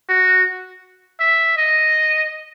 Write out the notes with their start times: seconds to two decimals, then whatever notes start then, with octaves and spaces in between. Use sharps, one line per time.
0.09 F#4
1.20 E5
1.57 D#5